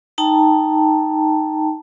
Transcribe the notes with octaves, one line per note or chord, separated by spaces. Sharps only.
D#4 G5 A5 A#5